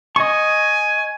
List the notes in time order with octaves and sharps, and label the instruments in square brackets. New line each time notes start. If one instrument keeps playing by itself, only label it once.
[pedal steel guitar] D#5 C#6 [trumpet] G#5